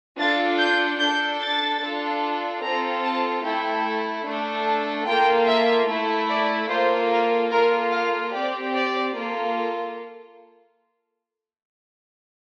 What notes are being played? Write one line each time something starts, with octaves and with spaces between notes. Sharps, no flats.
D4 F4 A4 A6
G6
D4 A4 G6
A6
D4 F4 A4
C4 F4 A4 A#5
A5
A3 E4 A4 G5
A3 D4 A4
A#3 F4 A4 G5
E5
A3 E4 A4
D5
A#3 F4 A4 C5
A#4
A#3 F4 A4 A#4
F5
C4 G4 D5
D5
A#3 F4 A4